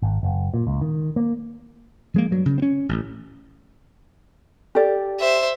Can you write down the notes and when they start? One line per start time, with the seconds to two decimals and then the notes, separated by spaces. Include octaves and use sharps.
0.02 G#1
0.23 F#1
0.54 A#2
0.67 C#2
0.81 D#3
1.16 A#3
2.14 F3 G#3 A#3
2.31 G2 F#3
2.46 C#3
2.58 C4 C#4
2.89 A1
4.75 G4 A4 D5
5.20 C5 E5